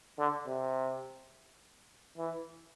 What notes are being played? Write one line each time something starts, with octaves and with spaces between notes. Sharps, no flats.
D3
C3
E3